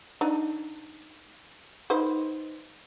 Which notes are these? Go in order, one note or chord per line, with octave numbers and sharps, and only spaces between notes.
D4 D#4
D#4 B4 C5